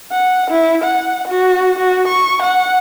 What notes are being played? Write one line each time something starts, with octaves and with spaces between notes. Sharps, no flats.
F#5
E4
F#5
F#4
F#4
C#6
F#5